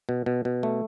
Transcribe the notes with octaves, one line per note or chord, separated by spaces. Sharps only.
B2
B2
B2
A3